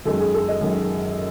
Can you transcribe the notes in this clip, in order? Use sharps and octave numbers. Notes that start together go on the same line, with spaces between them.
F#2 D#3 G#3 A4
G#4
A4
D#5
F#2 D#3 G#3